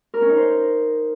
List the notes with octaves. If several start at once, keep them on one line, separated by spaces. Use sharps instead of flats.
A#4
C#4
D#4
C5